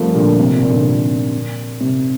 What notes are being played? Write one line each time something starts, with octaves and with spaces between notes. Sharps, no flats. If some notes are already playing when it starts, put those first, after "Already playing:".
Already playing: F3 G3 A3 A#3 C4
A#2 D3
C3
A#2
A#2
D3
C3
A#2
C3